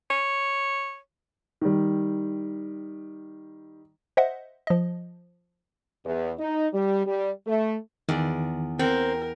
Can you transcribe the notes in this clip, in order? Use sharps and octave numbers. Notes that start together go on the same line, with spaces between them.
C#5
D#3 G3
C5 D#5 E5 F#5
F3 D#5
E2
D#4
G3
G3
A3
E2 D#3 D5
C4 A#4 F#5